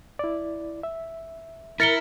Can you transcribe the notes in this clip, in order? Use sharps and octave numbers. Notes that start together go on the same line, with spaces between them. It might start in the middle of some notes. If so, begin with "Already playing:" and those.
E4 D5
E5
E4 A#4 A6 C#7 G7